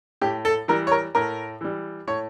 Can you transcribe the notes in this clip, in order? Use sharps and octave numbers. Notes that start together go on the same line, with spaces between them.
A2 G4
A4
E3 G3 A#4
C#5
A#4
A2 A#4
E3 G3
A2 C#5